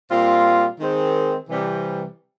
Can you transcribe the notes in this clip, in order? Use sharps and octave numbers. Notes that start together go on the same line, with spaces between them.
A#2 G3 C4 F4
D#3 G#3 C4
C3 E3 G3